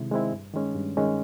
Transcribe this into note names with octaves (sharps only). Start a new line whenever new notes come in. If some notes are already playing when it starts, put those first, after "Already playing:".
Already playing: C3 D#3 G#3 C4 E4
D#3 G#3 C4 E4
G2
D#3 G#3 C#4
G2
D#3 G#3 C#4